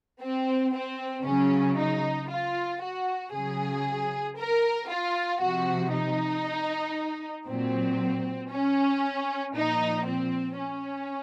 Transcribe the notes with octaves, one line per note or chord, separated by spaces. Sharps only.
C4
C4
C#3 F#3 C#4
D#4
F4
F#4
C#3 F#3 G#4
A#4
F4
C3 F3 F#4
D#4
A#2 F#3 C4
C#4
A#2 F3 D#4
C4
C#4